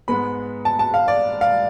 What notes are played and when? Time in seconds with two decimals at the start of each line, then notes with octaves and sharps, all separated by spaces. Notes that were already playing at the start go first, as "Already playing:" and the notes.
0.08 G#2 G#3 B3 B5
0.65 A5
0.79 A5
0.94 F5
1.08 D5
1.41 F5